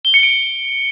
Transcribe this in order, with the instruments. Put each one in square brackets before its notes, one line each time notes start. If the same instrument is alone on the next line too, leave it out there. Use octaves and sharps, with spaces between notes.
[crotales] G7
C#7
D7